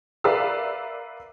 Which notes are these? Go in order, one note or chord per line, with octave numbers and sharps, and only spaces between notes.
A#4 B4 D5 E5 F5 E6